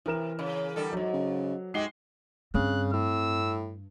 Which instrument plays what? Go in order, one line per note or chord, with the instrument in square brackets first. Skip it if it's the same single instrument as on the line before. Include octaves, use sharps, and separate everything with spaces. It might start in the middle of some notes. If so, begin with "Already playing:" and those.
[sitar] C3 [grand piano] E3 A#4 E7
[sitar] C#3
D3 G3 A4
[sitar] F2 G#2 [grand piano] F#3
[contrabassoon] C#3
[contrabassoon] G#2 [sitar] G#3 F#4 G4 [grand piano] C7 G7
[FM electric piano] G2 [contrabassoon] C#3 [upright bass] C4 [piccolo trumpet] F#6
[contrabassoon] A2 [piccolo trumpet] E6